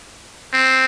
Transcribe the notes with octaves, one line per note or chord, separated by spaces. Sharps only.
C4